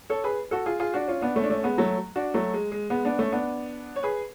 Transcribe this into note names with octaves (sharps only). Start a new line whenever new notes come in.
A4 C#5
G#4 B4
F#4 A4
F4 G#4
F4 G#4
D4 F#4
C#4 F4
B3 D4
A3 C#4
D4
A3 C#4
G#3 B3
F#3 A3
D4 F#4
F#3 A3
G#3
G#3
G#3 B3
B3 D4
A3 C#4
B3 D4
C#5
G#4 B4